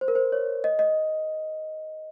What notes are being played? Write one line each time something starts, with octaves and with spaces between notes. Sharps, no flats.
C5
A#4
C5
C#5
D#5
D#5